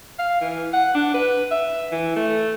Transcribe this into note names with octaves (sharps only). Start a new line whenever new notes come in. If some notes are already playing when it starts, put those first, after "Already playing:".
F5
E3
F#5
D4
B4
E5
E3
A3